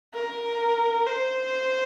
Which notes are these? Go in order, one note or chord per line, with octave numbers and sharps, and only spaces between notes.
A#4
C5